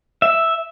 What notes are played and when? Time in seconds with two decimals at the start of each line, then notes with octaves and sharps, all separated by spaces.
0.22 E5